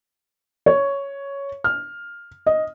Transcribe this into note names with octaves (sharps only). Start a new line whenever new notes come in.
C#5
F6
D#5